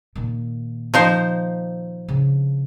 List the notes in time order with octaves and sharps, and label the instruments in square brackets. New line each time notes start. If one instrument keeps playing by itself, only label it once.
[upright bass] A#2 D#3
[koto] F3 D#4 C5
[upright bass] C#3 D4